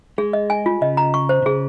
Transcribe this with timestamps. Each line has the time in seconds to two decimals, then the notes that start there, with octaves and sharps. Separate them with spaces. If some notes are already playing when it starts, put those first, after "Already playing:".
0.18 G#3 G#4
0.33 D#5
0.50 G#5
0.66 F4
0.81 C#3 D#5
0.97 A#5
1.14 C#6
1.29 C5
1.42 C3
1.46 C#3 G#4